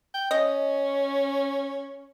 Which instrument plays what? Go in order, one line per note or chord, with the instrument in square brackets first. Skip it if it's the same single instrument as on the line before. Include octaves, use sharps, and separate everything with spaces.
[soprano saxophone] G5
[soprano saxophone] C#4 [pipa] D#5